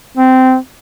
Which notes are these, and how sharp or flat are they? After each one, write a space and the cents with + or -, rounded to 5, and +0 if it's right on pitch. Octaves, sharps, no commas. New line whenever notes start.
C4 -15